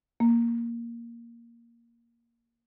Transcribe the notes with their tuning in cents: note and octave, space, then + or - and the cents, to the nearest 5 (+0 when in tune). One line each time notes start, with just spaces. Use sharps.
A#3 +5